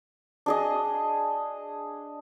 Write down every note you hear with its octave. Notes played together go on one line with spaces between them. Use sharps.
D4 G#4 D#5